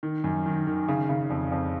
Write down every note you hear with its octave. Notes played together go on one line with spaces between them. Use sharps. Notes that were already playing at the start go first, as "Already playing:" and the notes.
D#3
F#2
D#3
D#3
C#3
C#3
F2
F2